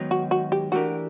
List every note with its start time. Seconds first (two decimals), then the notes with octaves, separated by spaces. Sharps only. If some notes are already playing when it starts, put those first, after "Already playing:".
Already playing: G#2 D#3 F#3 B3 D#4
0.11 F#4
0.31 F#4
0.52 G4
0.72 E3 A3 D4 F#4 G4 A#4